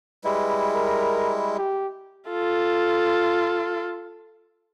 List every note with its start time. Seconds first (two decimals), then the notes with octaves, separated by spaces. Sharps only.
0.24 G3 G#3 E4 B4
0.74 A#4
1.58 G4
2.29 F4 A4